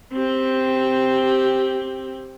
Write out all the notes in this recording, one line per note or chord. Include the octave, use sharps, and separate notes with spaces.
C4 G4